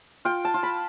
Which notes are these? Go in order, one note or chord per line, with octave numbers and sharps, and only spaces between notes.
F4 G5
A5
F4
B5